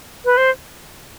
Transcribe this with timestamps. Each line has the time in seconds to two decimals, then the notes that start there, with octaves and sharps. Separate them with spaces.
0.25 B4
0.37 C5